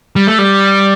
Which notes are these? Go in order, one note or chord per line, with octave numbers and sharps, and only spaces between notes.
G3
A3
G3